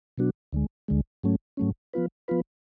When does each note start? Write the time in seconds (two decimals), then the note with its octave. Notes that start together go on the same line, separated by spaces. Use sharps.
0.18 B2 F#3 B3 D4 F#4
0.52 D2 D3 G#3
0.88 D2 D3 G#3
1.23 G#2 F#3 A3 C#4
1.57 G#2 F#3 A3 C#4
1.93 F3 B3 F4 B4
2.28 F3 B3 F4 B4